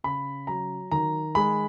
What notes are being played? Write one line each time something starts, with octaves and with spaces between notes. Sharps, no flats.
C#3 B5
F#3 A#5
D#3 A#5
G#3 B5